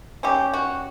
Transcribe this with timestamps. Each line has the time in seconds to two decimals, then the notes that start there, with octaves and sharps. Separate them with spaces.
0.23 G3 A#3 C#4 G4
0.53 F#4